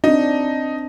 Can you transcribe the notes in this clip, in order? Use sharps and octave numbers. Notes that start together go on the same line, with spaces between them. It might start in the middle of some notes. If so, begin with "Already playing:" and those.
C4 D4 D#4